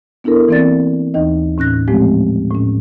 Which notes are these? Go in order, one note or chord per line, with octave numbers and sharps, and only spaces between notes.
B3 D4 E4 A4 A#4
E3 A#3 C4 D5 A6
D#2 E3 D#4 D#5
A2 C#4 F#6 A#6
A#2 F3 G#3 A3 C4 G4
A2 C#4